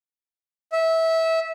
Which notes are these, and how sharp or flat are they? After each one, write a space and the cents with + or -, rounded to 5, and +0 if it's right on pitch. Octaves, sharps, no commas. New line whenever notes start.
E5 -20